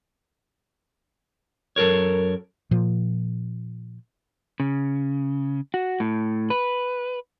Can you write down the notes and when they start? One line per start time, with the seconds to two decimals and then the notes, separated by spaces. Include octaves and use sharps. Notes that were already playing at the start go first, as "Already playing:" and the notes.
1.76 F#2 A4 A#4 C#5
2.71 A#2 F3
4.60 C#3
5.74 F#4
6.00 A2
6.50 B4